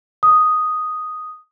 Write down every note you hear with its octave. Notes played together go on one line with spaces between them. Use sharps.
D#6